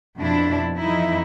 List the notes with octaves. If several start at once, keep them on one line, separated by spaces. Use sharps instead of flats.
F2 B2 D4 E4
F2 E3 D#4 E4